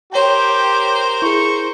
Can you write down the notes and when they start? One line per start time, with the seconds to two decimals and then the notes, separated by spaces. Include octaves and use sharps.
0.13 G4 A#4 C5 C#5 G5
1.22 E4 G#4 C#6